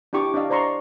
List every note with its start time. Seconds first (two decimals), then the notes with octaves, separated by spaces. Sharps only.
0.13 D4 E4 G4 C#6 D6
0.34 D4 D5 D#5 F5
0.50 C5 D5 A#5 C6 C#6